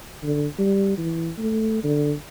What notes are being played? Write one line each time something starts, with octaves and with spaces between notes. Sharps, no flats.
D3
G3
E3
A3
D3